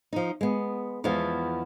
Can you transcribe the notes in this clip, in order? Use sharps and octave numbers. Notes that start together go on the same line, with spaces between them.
F3 D#4
G#3 B3
E2 F3 G#3 B3 E4